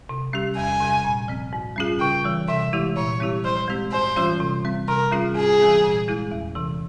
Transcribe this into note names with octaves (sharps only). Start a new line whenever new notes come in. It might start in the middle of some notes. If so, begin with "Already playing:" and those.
C3
G3 C#4 G4
E2 G#5
C3 G3
A#2
F3 C4
G#2
G3 C#4 F4 G#4
C#3 G5
E3 G3
C3 E5
E3 G#3 E4 G4
A#2 C#5
G3 C4 E4 G4
F3 C5
G#3 C4 G4
G#2 C5
E3 G3 C#4 F4
C3
G3 C4
C3 A#4
G3 C#4 F4 G#4
G#2 G#4
E3 G3 C4
A#2
G#3 E4 G#4
E2
C3 E3